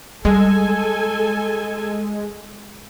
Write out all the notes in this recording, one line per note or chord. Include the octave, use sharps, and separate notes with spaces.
G3 G#3 A4 G#5